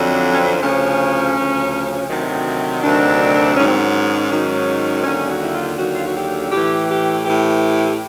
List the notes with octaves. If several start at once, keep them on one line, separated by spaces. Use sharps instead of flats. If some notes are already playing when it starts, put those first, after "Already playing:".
Already playing: F2 D3 F#3
D4
C#4
C4
D2 C#3 F3 C#4
D2 C#3 F3
D2 C3 D#3 F#3
D2 C3 D#3 F#3 D4
G#2 D#3 F#3 C#4
C4
C#4
G#2 D#3 F#3
D#2 D3 F#3 C#4
F#4
E4
F4
D#2 D3 F#3 F#4
F4
F#4
G4
A2 E3 G4
G4
A2 E3 G4